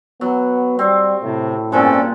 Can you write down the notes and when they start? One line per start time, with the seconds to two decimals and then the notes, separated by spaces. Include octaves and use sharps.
0.21 F#3 B3
0.79 G3 C4
1.23 A2 C3
1.72 G2 A#2 G#3 C4 C#4 A4